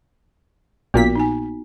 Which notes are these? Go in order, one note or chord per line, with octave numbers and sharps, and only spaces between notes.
A#1 A#2 B3 F#4 B6
D#4 G#5